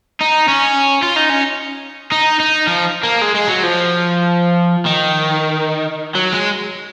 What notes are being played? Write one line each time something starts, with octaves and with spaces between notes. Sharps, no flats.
D#4
C#4
F4
D#4
C#4
D#4
D#4
F3
A#3
G#3
G#3
F#3
F3
D#3
F#3
G#3